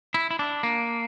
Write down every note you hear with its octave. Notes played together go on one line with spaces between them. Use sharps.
E4
E4
D4
A#3